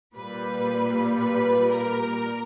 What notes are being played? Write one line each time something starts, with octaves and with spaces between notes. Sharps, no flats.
A#2 G3 A#3 B4
B4
A#4